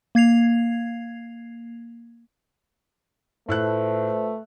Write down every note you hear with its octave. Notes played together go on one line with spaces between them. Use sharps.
A#3 G#6 C7 F7
A2 A3 F4 B4 C5 E6 F#6